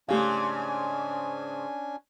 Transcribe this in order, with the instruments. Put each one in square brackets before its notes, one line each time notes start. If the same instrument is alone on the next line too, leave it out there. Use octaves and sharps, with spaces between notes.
[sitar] G#2 C#3 [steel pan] A3 G4 F5 [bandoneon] C#4 D4 G#5